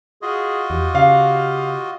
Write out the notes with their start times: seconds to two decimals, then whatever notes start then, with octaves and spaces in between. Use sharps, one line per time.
0.22 F4 F#4 G#4 D#5
0.70 E2 G4
0.95 C#3 G4 F5